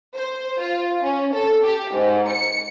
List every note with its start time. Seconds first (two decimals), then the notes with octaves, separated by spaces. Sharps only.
0.15 C5
0.61 F4
1.03 C#4
1.34 A4
1.64 G4
1.94 G#2
2.29 C#7